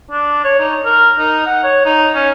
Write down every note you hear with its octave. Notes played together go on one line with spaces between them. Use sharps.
D4
C#5
D#4
A#4
D#4
F#5
C#5
D#4
C#4